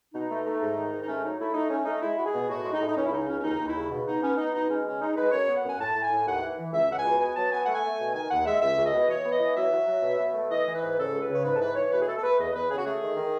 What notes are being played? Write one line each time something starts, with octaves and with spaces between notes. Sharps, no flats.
B2 D#4
A3
A3
G#2
D#3
G#2
D#4
A3 C#4
F#3 D#4
A3 E4
A3 D#4
A3 C#4
A3 D#4
G#3 E4
G#3 F#4
G#4
B2
A2 F#4
G#3
D#4
A2
D#4
C#2 C#4
E4
C#3 D#4
C#2 C#4
C#4
D#2 D#4
D#2
E4
C#3
B2
B2 D#4
B3 C#4
B3 D#4
B2 D#4
G#3 C#4
C#3 C#4
G#3 D#4
G#3 B4
F#2 C#5
B3
F#5
F#2 G#5
A2 A5
A2
G#5
A2
D#2 F#5
E3
E3
C#2 E5
C#2 F#5
G#5
B2
B3 G#5
F#3 A5
B3 G#5
A3 F#5
G#5
A3
B2
D#3 G#5
D#2 F#5
G#3 E5
C#2 E5
C#2
D#5
B2
E3 C#5
B3
D#5
E3
F#3 E5
F#3
F#3
B2
B2
A3
E3 D#5
E3
B4
G#2
C#3 A4
C#2
B4
C#3
C#5
G#2 B4
A4
E3 B4
E3 C#5
B2 B4
G#4
A3 A4
A4
A3 B4
E2 D#5
E2 B4
C#3 G#4
F#4
A3 G#4
D#3
D#3